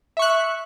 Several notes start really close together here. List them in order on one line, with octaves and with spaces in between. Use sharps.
E5 C#6 F#6